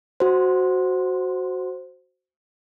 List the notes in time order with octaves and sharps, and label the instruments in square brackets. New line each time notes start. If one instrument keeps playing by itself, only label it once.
[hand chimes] F#4 C5